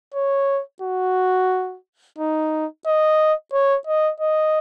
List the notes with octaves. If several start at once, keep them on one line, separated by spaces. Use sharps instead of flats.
C#5
F#4
D#4
D#5
C#5
D#5
D#5